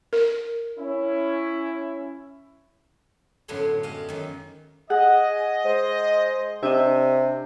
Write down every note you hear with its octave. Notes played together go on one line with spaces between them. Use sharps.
A#4
C#4 E4
F#2 A2 D3 B3 F#5 C6
G#3 G4 D#5 F5
F#2 D#3
G#4 D#5 F#5
G#3 C5
C3 D4 D#5 E5